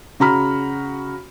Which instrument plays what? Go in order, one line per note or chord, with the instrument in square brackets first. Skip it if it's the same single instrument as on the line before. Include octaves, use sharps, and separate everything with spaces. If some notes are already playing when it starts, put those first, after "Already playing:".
[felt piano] C#3 F#4 A#5 B5 F6